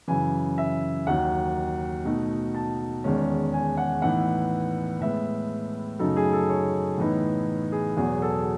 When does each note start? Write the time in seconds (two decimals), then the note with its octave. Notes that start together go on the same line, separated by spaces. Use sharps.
0.08 F#2 C#3 E3 G#5
0.58 E5
1.07 D#2 D#3 F#3 F#5
2.05 B2 A3 D#4
2.54 A5
3.04 E2 D#3 G#3 C#4
3.53 G#5
3.77 F#5
4.02 A2 E3 B3 D#4 F#5
5.01 A2 G#3 B3 E5
5.99 F#2 C#3 F#3 A3 D#4 A4
6.16 G#4
6.33 A4
6.49 C#5
6.98 A2 E3 B3 D#4
7.72 G#4
7.96 E2 B2 F#3 G#4
8.22 A4